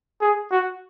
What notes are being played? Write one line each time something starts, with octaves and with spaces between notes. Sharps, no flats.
G#4
F#4